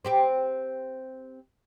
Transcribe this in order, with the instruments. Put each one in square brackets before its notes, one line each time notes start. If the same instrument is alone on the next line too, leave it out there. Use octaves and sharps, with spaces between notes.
[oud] C4 G4 C5